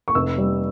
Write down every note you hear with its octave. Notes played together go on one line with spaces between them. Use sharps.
C#6
F1 E6
G3